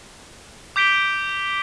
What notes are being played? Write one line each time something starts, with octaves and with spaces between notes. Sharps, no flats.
D6 G6 B6 D7 G7